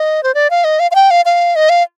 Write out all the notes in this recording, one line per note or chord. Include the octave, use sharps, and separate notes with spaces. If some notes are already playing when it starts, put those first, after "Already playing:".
Already playing: D#5
C5
D5
F5
D#5
F5
F5
G5
F5
F5
D#5
F5